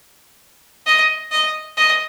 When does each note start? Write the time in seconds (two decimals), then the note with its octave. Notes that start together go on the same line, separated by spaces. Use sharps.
0.86 D#5
1.31 D#5
1.77 D#5